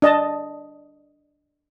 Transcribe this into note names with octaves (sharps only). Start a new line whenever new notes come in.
D4 D#5 A5